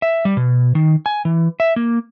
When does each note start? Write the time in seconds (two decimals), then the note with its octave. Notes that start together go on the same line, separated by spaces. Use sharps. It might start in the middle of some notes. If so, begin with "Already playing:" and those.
0.02 E5
0.25 G3
0.37 B2
0.75 D#3
1.06 G#5
1.25 E3
1.60 E5
1.76 A#3